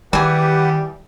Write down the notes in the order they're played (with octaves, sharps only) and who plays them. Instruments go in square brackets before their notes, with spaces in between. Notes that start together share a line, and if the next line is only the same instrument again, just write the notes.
[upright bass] D#3 [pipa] E3 G#4 [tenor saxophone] G3 [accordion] G4 B4 F#5